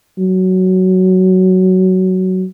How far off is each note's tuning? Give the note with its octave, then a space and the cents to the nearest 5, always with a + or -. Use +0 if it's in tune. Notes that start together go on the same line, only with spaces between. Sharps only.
F#3 +10